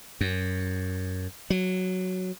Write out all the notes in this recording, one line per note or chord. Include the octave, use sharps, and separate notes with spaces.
F#2
F#3